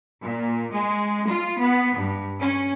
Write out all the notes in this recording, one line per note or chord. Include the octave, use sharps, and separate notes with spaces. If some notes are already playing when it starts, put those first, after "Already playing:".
A#2
G#3
F4
B3
G2
C#4